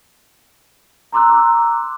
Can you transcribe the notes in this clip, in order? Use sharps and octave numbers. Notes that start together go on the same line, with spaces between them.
A#5 C6 D6 E6 F#6